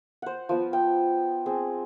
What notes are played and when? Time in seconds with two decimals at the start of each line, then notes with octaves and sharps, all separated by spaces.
0.22 C5 F#5
0.49 F3 B3
0.73 G5
1.46 C4 G#4